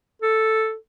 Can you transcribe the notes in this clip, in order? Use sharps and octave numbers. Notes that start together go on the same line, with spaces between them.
A4